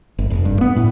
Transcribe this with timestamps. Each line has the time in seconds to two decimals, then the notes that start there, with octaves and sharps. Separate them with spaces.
0.19 G1
0.30 F1
0.45 G2
0.61 B3
0.76 A2